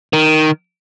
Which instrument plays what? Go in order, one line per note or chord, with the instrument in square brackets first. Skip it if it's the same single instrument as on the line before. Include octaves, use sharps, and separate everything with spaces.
[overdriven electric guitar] D#3